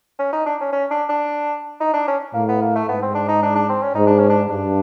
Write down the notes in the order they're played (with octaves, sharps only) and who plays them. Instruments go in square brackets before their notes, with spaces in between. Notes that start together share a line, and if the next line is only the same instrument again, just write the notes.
[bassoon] C#4
D#4
D4
C#4
C#4
D4
D4
D#4
D4
C#4
[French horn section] A2 [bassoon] A#3
[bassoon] B3
A#3
A3
[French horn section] G#2 [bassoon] B3
[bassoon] C4
D4
D#4
D4
D4
C4
C#4
[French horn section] G#2 [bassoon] D#4
[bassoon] D4
C#4
D4
[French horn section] G2 [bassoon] D4